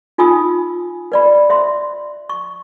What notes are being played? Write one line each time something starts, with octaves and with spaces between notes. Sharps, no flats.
D#4 F4 G#5 B5 D#6 E6
B4 D5 B5
C5 E5 C6
C#6